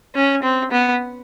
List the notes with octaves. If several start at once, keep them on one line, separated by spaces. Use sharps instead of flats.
C#4
C4
B3